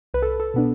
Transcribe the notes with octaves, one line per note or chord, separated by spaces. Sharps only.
C2 B4
A4
A4
B2 B3 D4